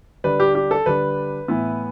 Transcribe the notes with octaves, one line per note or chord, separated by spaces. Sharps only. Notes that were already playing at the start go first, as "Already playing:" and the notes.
D3 G3 D4 B4
G4
G4
A4
D3 G3 D4 B4
A2 E3 B3 E4